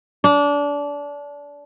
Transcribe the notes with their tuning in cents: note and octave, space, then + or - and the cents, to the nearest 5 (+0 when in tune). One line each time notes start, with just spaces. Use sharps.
D4 -25